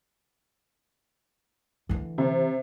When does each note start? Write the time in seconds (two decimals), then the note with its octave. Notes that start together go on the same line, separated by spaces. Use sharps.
1.89 D3 E3
2.18 C3